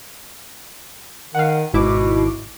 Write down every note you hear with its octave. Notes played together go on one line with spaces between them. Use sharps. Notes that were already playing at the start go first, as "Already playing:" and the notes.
D#3 F5 F#5
G#1 B2 E4 D6